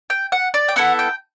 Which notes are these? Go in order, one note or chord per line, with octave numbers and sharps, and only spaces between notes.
G5
F#5
D5
G5
B3 E4 A4 F#5
G5